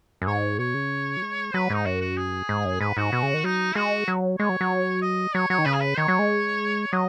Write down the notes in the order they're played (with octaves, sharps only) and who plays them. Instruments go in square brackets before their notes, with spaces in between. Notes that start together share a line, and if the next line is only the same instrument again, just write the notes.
[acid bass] F#2
[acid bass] G#2 [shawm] C#5
[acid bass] B2 [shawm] C#5
[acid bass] C#3
F#3
G#3
[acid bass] F#3 [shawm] B4
[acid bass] G#2 [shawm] D#4
[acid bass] F#2 [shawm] F#4
[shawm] F#4
G#4
[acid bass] G#2
F#2
[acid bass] G#2 [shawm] B4
[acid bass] G#2 [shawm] F#4
[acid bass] B2
C#3
D#3
[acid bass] F#3 [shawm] D#4
[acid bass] G#3 [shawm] F#4
[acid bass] F#3
[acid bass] G#3 [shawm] C#5
[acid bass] F#3
F#3
[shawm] D#5
[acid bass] F#3 [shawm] C#5
[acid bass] F#3 [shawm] C#5
[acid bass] D#3
[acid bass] C#3 [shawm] B4
[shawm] G#4
B4
[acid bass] D#3 [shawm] C#5
[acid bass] F#3
G#3
[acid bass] F#3 [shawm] D#5